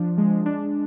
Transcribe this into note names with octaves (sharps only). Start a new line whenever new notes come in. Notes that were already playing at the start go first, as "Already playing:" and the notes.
Already playing: F3 D4
G#3
D4